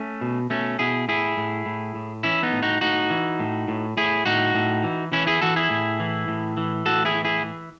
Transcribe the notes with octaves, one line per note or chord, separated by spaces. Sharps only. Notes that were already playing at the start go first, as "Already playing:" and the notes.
Already playing: A3 C#4
B2
B2 A3 C#4
B2 E4 G#4
A2 E4 G#4
A2
A2
A2
E3 C#4 E4
B3 D#4
A2
D#4 F#4
A2 D#4 F#4
E3
A2
A2
A2 E4 G#4
A2 D#4 F#4
A2
E3
E3 C#4 E4
E4 G#4
E3 F#4 A4
E4 G#4
A2
E3
A2
E3
A2 F#4 A4
E4 G#4
E3
E4 G#4
E3